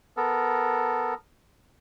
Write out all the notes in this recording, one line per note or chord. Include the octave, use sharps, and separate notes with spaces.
B3 A4 A#4